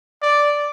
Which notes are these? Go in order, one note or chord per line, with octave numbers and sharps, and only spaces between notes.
D5